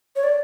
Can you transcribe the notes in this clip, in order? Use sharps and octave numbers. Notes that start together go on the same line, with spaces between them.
C#5
D5